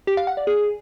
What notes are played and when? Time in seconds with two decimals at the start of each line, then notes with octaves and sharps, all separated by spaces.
0.07 G4
0.17 F5
0.27 F#5
0.37 D5
0.47 G#4